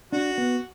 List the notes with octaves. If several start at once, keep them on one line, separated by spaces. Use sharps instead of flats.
D4 F#4
B3